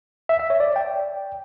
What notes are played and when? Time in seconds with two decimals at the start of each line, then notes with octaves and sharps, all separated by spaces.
0.29 E5
0.39 E5
0.50 C#5
0.60 D5
0.76 G5